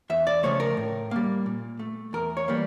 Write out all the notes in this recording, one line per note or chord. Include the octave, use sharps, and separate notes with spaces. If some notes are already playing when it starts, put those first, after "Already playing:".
E2 E5
D5
C#3 F3 A3 C#5
A#4
A2
G3 A#3
A#2
A3
E2 A#4
C#5
E3 G3 A#3